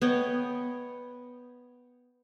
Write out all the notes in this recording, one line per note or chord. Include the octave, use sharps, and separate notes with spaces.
B3 C#5 D#5 G5